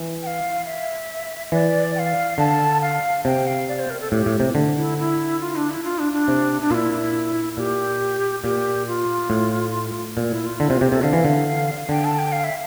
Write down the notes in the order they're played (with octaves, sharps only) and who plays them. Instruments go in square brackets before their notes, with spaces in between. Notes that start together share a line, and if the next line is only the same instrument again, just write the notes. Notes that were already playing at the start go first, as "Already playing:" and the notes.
Already playing: [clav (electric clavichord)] E3
[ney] G5
F5
E5
[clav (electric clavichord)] E3 [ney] D5
[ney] G5
F5
[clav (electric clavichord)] D3 [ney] A5
[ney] F5
[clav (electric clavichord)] C3 [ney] G5
[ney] F5
D5
C5
A#4
A4
[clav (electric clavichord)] A2 [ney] G4
[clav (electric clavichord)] A2
C3
D3
[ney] E4
E4
F4
D4
E4
F4
D4
D4
[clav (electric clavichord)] C3
[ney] D4
[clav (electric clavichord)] A#2 [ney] F4
[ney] E4
[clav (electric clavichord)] A#2 [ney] G4
[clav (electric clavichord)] A#2 [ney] G4
[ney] F4
[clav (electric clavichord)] A2
A#2
[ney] E4
F4
[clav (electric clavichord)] D3 [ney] E4
[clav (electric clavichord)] C3 [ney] F4
[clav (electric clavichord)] C3 [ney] G4
[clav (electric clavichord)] C3 [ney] A4
[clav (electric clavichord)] D3 [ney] F5
[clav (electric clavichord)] E3
D3
[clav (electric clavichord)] D3 [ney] G5
[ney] A5
G5
F5
E5